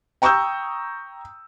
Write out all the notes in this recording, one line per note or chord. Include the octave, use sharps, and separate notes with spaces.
G5 A#5 C#6 D#6 E6 G6